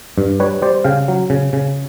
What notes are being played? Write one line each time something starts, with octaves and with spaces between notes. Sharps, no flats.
G2
G3 B4 C#5
G3 C5 D5
C#3 F5 G5
F#3
C#3
C#3